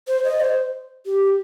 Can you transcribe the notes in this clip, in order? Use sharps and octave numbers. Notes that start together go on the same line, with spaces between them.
C5
D#5
C5
G4